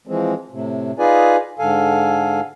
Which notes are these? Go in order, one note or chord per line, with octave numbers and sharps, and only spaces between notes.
E3 F3 G#3 C4
A2 C3
D#4 F4 G#4 B4 D5 G#5
G#2 D3 A4 F5 G#5